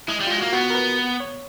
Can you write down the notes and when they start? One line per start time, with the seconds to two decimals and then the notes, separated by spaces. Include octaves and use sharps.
0.08 G#3 E4
0.20 G3
0.27 G#3 F4
0.38 A#3 F#4
0.53 B3 F#4
0.70 A#4
0.75 B4
1.20 C#5